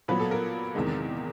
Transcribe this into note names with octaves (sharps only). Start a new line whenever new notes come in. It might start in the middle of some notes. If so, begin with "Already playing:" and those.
A#2 F#3 B3 B4
A4
A#4
E2 C3 D#3 G#3